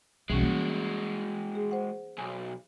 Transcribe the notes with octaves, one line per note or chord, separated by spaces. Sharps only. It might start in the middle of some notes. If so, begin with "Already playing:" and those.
B1 E3 G3 G#3 C#4 F#4
A#3
G#4
C5 F#5
B1 G#5